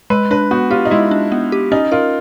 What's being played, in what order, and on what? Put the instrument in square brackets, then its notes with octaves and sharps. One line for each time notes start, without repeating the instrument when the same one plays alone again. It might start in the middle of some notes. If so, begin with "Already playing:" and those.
[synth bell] G#3 [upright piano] B4
[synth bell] D4 [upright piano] B4
[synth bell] B3 [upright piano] F#4
[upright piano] F4 [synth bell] G4
[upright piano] D#4
[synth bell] G#3 [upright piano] E4
[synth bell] D4
B3
G4
[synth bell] C#4 [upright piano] D#4
[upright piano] F4 [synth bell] A#4